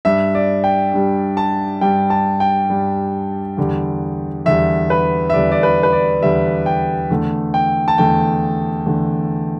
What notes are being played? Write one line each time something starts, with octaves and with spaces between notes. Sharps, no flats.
G2 G3 E5
D5
G5
G2 G3
A5
G2 G3 G5
A5
G5
G2 G3
E2 D3 G3
E2 D3 G3 E5
B4
E5
E2 D3 G3 D5
D5
B4
B4
D5
E2 D3 G3 E5
G5
E2 D3 A3
G5
A5
E2 D3 A3 G5
E2 D3 A3